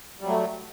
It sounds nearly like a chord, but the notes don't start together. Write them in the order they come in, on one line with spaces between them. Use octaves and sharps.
G3 F#3 A3